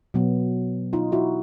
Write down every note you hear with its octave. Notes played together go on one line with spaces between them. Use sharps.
B2 F#3 B3
D#4 F4
E4 F#4